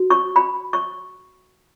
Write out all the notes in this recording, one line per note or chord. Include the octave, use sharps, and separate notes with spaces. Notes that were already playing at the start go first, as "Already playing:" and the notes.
Already playing: F#4
C#6
B5
C#6